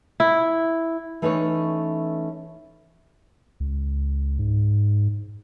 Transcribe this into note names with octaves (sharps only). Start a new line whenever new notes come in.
E4
E3 A3 C#4 D#4 A4 C#5
C#2
G#2